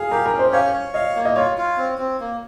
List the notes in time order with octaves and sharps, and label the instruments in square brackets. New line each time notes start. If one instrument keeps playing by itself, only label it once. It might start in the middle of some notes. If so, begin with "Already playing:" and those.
Already playing: [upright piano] G#4 [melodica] F5
[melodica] G4 [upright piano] A#4
[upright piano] A#4
[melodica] C#4
[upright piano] C5
[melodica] C#5 [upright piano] F5
[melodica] C#5
[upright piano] D#5 [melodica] F5
[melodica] A#3
[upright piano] D#5
[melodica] F4 [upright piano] C#5
[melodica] F4
C4
C4
A#3